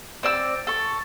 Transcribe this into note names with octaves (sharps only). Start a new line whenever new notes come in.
C4 D5 E6
A4 C#6